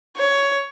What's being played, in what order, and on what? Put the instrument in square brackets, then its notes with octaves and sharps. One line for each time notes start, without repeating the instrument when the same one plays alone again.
[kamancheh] C#5